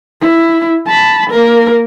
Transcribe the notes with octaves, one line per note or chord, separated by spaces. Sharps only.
E4
A5 B5
A#3 A#4